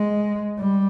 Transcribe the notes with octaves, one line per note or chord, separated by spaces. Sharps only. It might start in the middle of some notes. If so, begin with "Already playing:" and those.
Already playing: G#3
G3